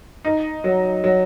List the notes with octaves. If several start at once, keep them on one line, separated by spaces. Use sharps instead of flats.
D#4
F#3
F#3